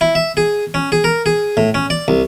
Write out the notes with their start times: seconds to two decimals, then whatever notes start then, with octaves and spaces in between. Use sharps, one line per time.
0.01 E4
0.15 E5
0.37 G#4
0.74 C#4
0.92 G#4
1.04 A#4
1.26 G#4
1.57 A2
1.74 C#4
1.90 D5
2.08 C2